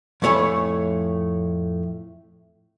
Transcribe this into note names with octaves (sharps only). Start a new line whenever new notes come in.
F2 A2 A3 C#5 G#5 B5